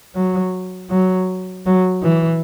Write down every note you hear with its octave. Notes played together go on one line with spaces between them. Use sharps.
F#3
F#3
F#3
E3